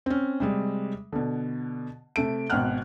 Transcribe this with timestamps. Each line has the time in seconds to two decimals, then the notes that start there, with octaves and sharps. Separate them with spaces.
0.06 C4 C#4
0.40 C3 G3 G#3
1.13 B2 D3
2.16 C3 A3 D7
2.50 G#1 B2 F#5 G5 F6 F#6